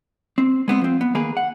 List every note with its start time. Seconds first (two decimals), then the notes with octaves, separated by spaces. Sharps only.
0.38 C4
0.68 G#3 B3 C4
0.81 F3 C4
1.01 B3
1.15 D#3 A#3 G#4 A#4 B4
1.37 F#5